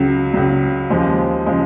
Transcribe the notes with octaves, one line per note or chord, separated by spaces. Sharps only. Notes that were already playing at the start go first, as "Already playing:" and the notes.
Already playing: C#2 C#3 F#3
C#2 C#3 F#3
D#2 C#3 F3 G#3
C#3 F3 G#3